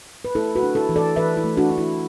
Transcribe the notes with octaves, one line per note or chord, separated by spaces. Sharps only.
B4
A3 E4 A4
F#4 B4
D4
E4 A4
E3
A4 D5
E3 B4 E5
E4
A3
D4 F#4
D4
E4